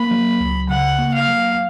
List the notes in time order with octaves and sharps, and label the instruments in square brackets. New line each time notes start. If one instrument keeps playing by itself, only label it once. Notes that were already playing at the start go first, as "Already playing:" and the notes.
Already playing: [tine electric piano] A#3 [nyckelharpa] B5
[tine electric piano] F#3
C#2
[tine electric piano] C#3 [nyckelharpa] F#5
[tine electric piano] A#3
[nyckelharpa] F5
[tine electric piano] F#3